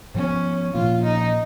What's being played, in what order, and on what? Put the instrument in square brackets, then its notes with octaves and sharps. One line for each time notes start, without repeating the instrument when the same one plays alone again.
[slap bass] G#2 F3 B3 [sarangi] C#4
[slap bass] A#2 F3 A#3 C#4 [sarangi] F4
[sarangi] D#4